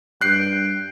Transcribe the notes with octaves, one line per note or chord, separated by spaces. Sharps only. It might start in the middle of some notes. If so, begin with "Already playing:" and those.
G2 G5 F#6 C7